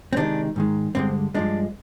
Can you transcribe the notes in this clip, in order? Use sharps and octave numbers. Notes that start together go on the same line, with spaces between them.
C4
C3 D#3 G#3 D4
G#2 D#3 G#3
G2 D3 G#3 C4
G2 F3 G#3 D4